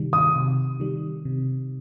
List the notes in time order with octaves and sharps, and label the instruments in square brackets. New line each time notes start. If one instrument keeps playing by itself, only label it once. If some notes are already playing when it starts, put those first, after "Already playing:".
Already playing: [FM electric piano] C3 D#3 G3
[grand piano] D#6
[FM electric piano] C3
D#3 G3
C3